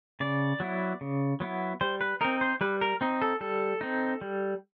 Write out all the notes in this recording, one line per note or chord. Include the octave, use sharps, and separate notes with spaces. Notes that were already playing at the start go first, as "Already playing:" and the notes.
C#3 D5
F#3 B3 E4
C#3
F#3 B3 E4
G3 C5
B4
C4 D#4 A#4
C5
G3 B4
A#4
C4 D#4
A4
G3 A4
C4 D#4
G3